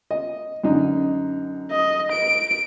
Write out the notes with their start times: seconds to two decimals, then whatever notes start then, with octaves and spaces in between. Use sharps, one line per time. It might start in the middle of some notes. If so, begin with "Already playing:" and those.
0.11 D#5
0.64 F#2 D3 D#4
1.71 D#5
2.12 D7